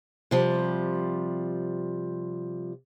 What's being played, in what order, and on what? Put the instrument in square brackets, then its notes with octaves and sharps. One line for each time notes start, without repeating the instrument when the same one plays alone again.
[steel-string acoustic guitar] C3 F3 G3